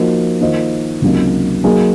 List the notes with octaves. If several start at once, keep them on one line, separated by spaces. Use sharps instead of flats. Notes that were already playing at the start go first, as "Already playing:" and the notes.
Already playing: F3 A#3 D#4 F#4
D#3 A#3 F4 C5 D#5
C#2 C3 F#3 A#3 D#4
F#3 A#3 D#4 G#4